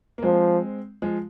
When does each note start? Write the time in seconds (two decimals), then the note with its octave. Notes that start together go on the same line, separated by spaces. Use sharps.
0.18 A#3
0.22 F3 G#3 C4
1.02 F3 G#3